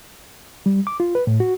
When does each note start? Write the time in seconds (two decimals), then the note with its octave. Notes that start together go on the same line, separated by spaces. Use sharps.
0.66 G3
0.87 D6
1.00 F4
1.15 B4
1.27 A2
1.40 F#4